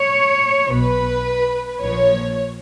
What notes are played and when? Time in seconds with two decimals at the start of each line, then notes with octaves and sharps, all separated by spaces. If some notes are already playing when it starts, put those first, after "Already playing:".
Already playing: C#5
0.69 B1 B2 B4
1.80 A#1 A#2 F3 C#5